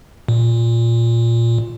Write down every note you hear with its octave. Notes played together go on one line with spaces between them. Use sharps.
A#2